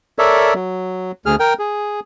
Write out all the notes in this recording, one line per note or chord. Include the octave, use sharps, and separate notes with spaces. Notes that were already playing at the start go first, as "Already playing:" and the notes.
A4 A#4 C#5 D5 E5
F#3
D2 G#4 F6
A#4 G5
G#4